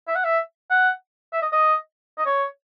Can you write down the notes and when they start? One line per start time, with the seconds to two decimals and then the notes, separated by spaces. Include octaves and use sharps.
0.08 E5
0.15 F#5
0.25 E5
0.70 F#5
1.33 E5
1.42 D#5
1.52 D#5
2.18 D#5
2.26 C#5